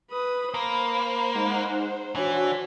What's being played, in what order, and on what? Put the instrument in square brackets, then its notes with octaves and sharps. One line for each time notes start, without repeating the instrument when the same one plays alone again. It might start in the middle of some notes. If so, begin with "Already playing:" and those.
[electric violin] B4 D#6 [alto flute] B5
[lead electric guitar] A#3 [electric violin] C5
[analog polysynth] G#3 D#4 F#5
[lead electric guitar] E3 [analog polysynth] D4 F#4 [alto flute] C#5